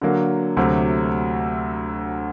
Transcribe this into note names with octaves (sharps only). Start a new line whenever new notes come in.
D3 F#3 A#3
D2 C3 F#3 A3